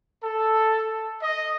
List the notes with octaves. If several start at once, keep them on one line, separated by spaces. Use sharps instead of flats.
A4
D#5